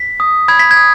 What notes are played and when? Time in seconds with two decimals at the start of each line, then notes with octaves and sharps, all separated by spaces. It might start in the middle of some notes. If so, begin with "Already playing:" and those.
Already playing: B6
0.20 D#6
0.48 B5 G#6
0.59 B6
0.71 G#6
0.77 D#6